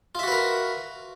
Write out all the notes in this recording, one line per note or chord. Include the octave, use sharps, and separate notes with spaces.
F4 F#4 A#4 B4 E5